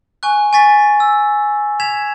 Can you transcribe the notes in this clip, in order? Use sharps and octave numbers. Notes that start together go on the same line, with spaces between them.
G#5 C#6 F#6
G#5 C#6 A6 B6
E6
G#6 B6 E7 F7